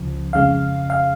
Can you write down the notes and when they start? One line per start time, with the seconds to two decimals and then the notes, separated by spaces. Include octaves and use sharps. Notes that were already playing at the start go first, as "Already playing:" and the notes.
Already playing: C#2 C#3 F3
0.33 F2 C#3 G#3 F5
0.90 F5